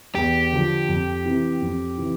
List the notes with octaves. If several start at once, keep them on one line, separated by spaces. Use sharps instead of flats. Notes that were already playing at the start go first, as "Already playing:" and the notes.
E2 G4
D3 F3
F2
C3 E3
F2
C3 E3